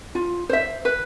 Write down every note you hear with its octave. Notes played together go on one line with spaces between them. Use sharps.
F4
C5 E5
B4